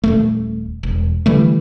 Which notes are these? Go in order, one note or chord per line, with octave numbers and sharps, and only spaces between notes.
D#1 F2 A3
E1
D3 E3 G3 A3